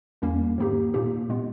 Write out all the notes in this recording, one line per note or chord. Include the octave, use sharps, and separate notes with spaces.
E2 D#3 G3 A#3 C#4
G#2 D#3 A#3 D#4 G4
A#2 A#3 D#4 G4
A#2 G#3 B3